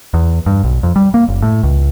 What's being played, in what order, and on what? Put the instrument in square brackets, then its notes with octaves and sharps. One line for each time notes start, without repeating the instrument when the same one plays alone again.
[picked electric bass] E2
G2
B1
F2
G3
A#3
F#1
A2
C#2